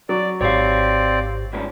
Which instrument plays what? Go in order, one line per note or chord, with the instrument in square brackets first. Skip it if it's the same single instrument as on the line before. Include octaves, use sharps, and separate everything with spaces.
[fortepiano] F#3 [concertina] D5
[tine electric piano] G#1 G#2 G4 [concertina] C4 D5 [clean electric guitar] C#5 F5
[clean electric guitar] G2 G#3 C#4